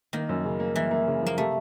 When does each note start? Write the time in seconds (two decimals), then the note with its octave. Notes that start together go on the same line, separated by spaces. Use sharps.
0.13 D#3 A#3
0.29 F#2
0.45 C#3
0.60 A#3
0.76 E3 A#3
0.91 A#3
1.07 C#3
1.22 F3 A#3
1.38 C3 A3